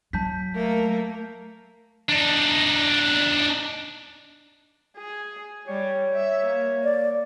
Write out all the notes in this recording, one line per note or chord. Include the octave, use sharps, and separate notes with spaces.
F#3 A5 G6 B6
A3 A#3 A#4
D4 D#4
G#4
G3 C#5
E5
A#3
D5